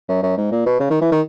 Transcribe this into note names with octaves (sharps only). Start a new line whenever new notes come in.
F#2
F#2
G#2
A#2
B2
C#3
D#3
E3
D#3